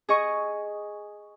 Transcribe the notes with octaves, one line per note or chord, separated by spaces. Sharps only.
G#4 D#5 C#6